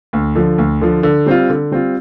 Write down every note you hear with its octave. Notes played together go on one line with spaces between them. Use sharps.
D2
D3 F3
D2
D3 F3
D3
G3 C4 F4
D3
G3 C4 F4